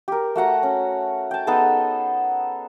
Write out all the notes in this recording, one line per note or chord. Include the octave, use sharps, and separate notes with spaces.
G4 A#4
A3 F#4 F#5 A#5
C#4
G5 A5
B3 D#4 G#4 A4